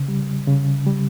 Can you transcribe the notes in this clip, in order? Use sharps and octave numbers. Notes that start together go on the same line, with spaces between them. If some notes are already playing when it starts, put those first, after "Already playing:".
Already playing: C#3
G3
C#3
G3